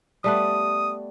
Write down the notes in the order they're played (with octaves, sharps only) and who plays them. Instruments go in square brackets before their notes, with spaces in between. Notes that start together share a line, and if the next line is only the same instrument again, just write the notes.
[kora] G3 A3 B3 [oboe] D#6